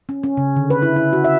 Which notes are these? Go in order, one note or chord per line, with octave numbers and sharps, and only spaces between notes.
C#4
C#4
C#3
D3
B4
E4
E4
F#4
E5